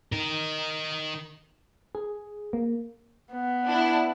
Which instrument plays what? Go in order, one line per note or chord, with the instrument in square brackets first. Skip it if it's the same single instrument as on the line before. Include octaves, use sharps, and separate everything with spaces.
[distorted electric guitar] D#4 A#4
[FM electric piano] G#4
A#3
[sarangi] B3
[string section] D4 E4